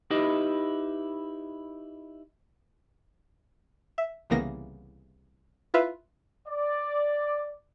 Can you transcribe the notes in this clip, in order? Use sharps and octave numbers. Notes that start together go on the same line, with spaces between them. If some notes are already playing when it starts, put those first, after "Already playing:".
D#4 E4 G4 B4 D#5 E5
E5
C2 C#3 E3 A#3 B3 A#6
E4 F4 B4 E5 F5
D5